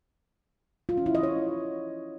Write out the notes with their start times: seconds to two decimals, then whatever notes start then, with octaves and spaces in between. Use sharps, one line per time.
0.89 F4
0.97 C#4
1.06 E4
1.15 D#5
1.23 C#5